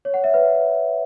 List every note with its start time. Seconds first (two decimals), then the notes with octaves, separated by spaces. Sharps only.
0.05 C#5
0.14 F#5
0.24 E5
0.34 B4